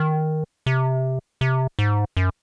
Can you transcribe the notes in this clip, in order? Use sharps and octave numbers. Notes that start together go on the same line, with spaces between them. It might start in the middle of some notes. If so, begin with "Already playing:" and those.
Already playing: D#3
C3
C3
G#2
F#2